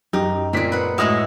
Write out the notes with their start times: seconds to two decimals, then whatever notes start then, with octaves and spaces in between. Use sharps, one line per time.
0.13 F#2 D#4 G4
0.53 A#2 A#3 C4 G#4 B6
0.72 B4 F#5
0.98 A2 G#3 E4 F#4 D#6